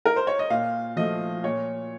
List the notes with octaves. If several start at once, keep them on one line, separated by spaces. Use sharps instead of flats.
A#4
C5
C#5
D#5
A#2 F5
F3 A3 D#5
A#2 C#5